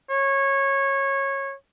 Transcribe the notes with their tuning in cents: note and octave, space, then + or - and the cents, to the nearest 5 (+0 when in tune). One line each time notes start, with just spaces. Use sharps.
C#5 -20